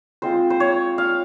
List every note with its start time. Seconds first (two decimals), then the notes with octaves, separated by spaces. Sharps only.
0.22 G#3 C4 F4 C5
0.50 C5
0.60 C#5
0.98 F5